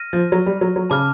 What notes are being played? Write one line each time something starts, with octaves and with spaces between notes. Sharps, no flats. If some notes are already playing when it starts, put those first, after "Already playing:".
Already playing: F6 A#6 D#7
F3
F#3
G3
F#3
F#3
C#3 A5 D6 F6